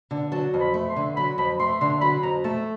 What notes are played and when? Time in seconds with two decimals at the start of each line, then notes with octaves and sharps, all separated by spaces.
0.11 D3
0.32 F#3 A5
0.54 F2
0.60 B5
0.74 A3
0.89 C6
0.96 D3
1.16 F#3 B5
1.38 F2 B5
1.59 A3 C6
1.81 D3 C6
2.01 F#3 B5
2.23 F2 A#5
2.44 A3 A5